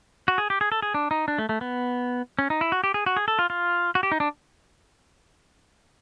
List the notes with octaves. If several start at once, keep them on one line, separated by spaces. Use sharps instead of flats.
F#4
G#4
G4
G#4
A4
G#4
D4
D#4
D4
A3
A3
B3
C#4
D#4
E4
F#4
G4
G#4
F#4
G#4
A4
F4
F4
F#4
G4
D#4
D4